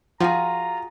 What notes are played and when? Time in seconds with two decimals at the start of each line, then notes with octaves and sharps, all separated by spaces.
0.20 F3 F4 F#4 G#4 A#5